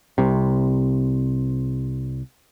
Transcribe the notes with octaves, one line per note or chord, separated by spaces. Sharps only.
C2 C3